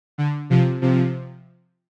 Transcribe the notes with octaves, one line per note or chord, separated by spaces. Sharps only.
D3
C3 F3
C3 F3